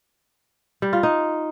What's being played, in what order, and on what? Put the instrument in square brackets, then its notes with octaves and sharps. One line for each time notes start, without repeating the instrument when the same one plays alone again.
[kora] G3
F4
D#4